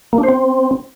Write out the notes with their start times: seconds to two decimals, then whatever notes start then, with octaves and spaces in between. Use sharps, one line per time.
0.13 A#3
0.18 D4
0.23 C5
0.29 C4